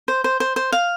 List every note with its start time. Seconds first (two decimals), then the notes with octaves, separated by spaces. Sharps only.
0.08 C5
0.24 C5
0.40 C5
0.56 C5
0.72 F5